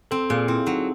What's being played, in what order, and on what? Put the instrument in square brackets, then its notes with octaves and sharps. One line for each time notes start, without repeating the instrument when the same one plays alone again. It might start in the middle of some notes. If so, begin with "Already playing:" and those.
[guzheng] C4 [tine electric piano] A4
[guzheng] A#2 [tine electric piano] G#4
[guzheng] C4 [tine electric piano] E4
[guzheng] F#3 [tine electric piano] D#4